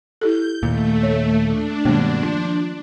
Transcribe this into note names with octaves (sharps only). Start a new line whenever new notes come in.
E4 G4 A4 G6
D#2 A#2 A3
C#5
D4
G2 B2 D#3 G#3 A#3
F3